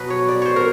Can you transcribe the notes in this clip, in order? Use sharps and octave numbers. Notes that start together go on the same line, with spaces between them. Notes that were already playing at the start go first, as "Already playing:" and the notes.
Already playing: B2 F#3 B4
C#5
D5
C5 C#5
A#4